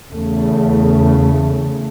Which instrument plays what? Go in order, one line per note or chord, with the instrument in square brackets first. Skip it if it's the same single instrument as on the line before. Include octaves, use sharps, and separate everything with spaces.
[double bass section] E2 C#3 A3